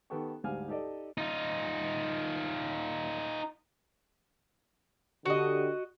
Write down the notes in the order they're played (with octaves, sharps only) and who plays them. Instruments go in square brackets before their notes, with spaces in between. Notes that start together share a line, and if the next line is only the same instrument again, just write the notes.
[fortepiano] D#3 B3 G4 A4 G5 C#6
D2 G#2 G3 F5 G#5 F6
D#4 G4 A4 D5 D#5
[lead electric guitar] D#4 F4
[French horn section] D3 G4 [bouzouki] F#4 D#5